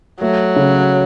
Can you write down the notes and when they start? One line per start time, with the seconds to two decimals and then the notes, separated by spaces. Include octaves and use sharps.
0.21 F#3 A3
0.56 C#3